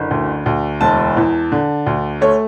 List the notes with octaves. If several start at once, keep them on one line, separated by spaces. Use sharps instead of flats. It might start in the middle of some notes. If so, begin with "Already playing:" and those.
Already playing: F#1 D3
D2
D2
E1 A5
E2
D3
D2
A3 C#5